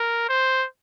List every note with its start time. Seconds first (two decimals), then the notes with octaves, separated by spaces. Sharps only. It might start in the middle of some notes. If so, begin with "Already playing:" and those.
Already playing: A#4
0.29 C5